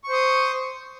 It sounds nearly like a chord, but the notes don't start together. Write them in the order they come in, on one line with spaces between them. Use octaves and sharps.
C#6 C5 D#6